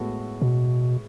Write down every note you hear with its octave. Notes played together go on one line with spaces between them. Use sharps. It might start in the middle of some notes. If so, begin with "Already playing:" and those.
Already playing: A2 G#3 B3 F#4 A4
B2